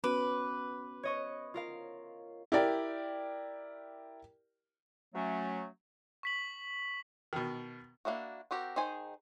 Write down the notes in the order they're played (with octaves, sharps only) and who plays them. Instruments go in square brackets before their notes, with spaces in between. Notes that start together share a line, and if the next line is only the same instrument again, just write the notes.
[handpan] B3 C#4 F#4 [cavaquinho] B4 [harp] D6
[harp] C#5 D#5 C#6
F4 A#4 F5
[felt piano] E4 G4 A#4 D5 G5
[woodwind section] F#3 A3 C#4
[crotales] C#6 B6 F#7
[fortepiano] B2 D#3
[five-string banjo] A#3 D4 E4 F#4
C4 F#4 G4 A#4
D#3 D#4 G#4 C5 G#5